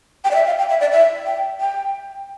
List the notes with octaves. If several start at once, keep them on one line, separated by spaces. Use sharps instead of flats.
G5
D5
E5
F5
G5
E5
D5
E5
G5
G5